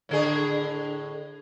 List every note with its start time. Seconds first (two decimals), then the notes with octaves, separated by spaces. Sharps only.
0.09 A2 D3 G#4